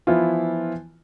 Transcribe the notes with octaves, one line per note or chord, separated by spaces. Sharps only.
E3 F3 B3 E4 F4